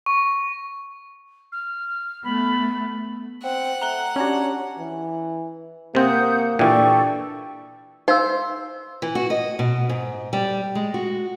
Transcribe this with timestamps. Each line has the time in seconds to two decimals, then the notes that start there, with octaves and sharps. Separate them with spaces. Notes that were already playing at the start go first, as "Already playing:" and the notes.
0.06 C#6
1.52 F6
2.24 A3 B3 B5
3.44 C4 F#5
3.81 A3 A#5 F#6 G7
4.16 C#4 D4 F#4 G4 A#5 G#6
4.79 E3
5.95 C3 A#3 C4 F#5 D#6 G6
6.59 A#2 E3 D4 G4 A4 D5 C#6
8.08 D#4 C5 F5 E6
9.02 E3
9.15 F#4
9.30 D#5
9.59 B2
9.89 G#2
10.33 G3
10.75 G#3
10.94 F#4